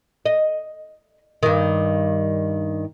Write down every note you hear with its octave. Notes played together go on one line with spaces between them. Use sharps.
D#5
G2 D#3